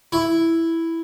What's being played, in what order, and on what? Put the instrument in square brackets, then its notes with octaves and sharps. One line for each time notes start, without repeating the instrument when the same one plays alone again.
[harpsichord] E4